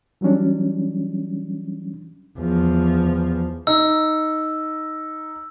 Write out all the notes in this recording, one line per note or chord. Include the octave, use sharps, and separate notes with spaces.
E3 F#3 G3 C#4 D4
E2 F3
D#4 E6